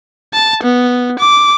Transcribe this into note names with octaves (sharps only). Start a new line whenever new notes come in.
A5
B3
D6